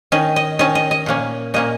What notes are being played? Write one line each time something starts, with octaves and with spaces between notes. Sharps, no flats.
D#3 C#4 D#5
D#5
D#3 C#4 D#5
D#5
D#5
A#2 A#3 C#4
A#2 A#3 C#4 D#5